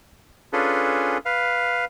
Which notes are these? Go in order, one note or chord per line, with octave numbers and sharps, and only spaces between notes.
C#4 D4 F4 G#4 A4 B4
B4 F5